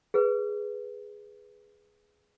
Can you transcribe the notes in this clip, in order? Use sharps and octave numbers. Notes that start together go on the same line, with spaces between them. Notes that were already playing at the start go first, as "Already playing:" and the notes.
G#4 B4